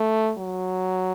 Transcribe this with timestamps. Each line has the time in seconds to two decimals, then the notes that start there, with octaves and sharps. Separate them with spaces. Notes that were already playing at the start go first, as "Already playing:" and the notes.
Already playing: A3
0.38 F#3